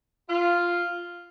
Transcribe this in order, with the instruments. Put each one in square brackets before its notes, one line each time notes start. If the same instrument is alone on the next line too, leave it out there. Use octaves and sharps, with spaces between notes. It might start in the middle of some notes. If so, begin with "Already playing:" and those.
[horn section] F4